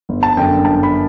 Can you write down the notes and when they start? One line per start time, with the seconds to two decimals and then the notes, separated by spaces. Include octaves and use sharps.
0.09 G1
0.23 A5
0.37 F#2 D3 G5
0.64 G1 A5
0.83 B5